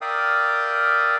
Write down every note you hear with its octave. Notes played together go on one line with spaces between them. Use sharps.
A#4 D5 E5 F5 G5 D#6